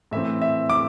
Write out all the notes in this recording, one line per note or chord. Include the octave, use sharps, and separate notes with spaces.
A2 E3 A3 C4 E5
E5
D6